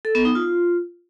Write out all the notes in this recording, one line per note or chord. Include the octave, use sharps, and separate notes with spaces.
A4
B3
D#4
F4